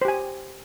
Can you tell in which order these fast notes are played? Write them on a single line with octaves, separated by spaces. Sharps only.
C5 G4 G#5